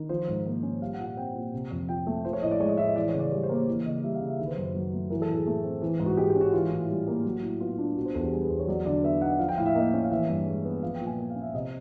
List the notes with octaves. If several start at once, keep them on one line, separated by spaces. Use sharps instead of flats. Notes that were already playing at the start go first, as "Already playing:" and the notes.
Already playing: D#3
F3 C5
G#2
A#3
C#4
G3 F5
F#5
A#2
F#5
C4 G5
A#2
C3
F2
F3 G5
A3
F3 C5
C#5
A2 D#5
D5
G#3 C#5
D#5
A2 E5
D#5
E3 D5
C#5
C#3
D5
G3 C#5
C5
A#3
C#5
E3
C#3 D#5
G3 E5
F5
C#3
E5
D#3 E5
B4
C5
F#2
B4
F#3
A3
E3 A#4
A4
A2
G#4
A3
C4
E3
G#2
F#4
G#3 G4
G4
C#4
F#4
E3 F4
A2
G3
A#3
F#3
A2
B3 F4
D4 F4
B2 F#4
C5
E2 A4
G4
G3 G#4
B4
E2 C5
C#5
F#3 D5
D3 D5
B3 E5
D#4 F#5
F3 F5
G5
A2 F5
E5
A#3 D#5
C#4
F5
E3 E5
G2
G#3
B3
F3 F5
G5
A#2
G#5
A#3
F5
C#4
E5
C3 D#5